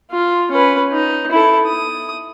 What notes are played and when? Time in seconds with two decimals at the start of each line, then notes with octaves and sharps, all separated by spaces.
0.11 F4
0.51 C#4 B4
0.92 D#4
1.31 E4 A4
1.67 D#6